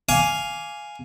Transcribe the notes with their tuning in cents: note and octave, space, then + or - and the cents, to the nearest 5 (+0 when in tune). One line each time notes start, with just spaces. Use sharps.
F5 +0 G#5 +0 D6 -15